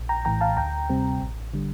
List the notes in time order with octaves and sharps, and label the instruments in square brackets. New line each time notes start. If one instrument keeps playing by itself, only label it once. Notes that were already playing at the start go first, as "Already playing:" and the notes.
Already playing: [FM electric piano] A#1
G5 A#5
A2 E3 G5 A#5
F5 A5
D2 G5 A#5
C3 G3 C4
A1
D3 G3